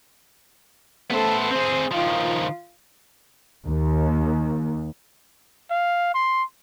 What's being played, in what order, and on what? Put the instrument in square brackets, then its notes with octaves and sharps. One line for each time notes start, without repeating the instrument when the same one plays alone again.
[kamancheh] A3 A4 [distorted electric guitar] B3 C5
[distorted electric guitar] C4 G#4 [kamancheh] C5
[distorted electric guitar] D#3 F3 [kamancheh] F4
[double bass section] D#2
[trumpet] F5
C6